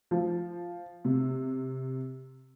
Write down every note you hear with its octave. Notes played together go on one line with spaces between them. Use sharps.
F3
C3